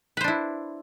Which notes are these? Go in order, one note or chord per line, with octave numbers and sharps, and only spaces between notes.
D4 E4 B4 C5